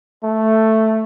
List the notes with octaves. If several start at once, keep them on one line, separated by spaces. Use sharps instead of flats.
A3